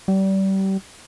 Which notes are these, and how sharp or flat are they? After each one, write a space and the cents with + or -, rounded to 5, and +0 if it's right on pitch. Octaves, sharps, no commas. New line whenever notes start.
G3 -30